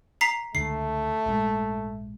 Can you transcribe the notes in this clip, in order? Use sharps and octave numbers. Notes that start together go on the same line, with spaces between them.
A#5 B6 C7
C#2 D3 A3 C7
A#1 G#2 G#3